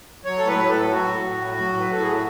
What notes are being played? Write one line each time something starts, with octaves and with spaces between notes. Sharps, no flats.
F#3 C#5
A2 A4
B4
A2
A4
F#3
F#3 F#4
A2
A2
F#3
F#3
A2
B4
A2 A4
F#3 G#4
F#4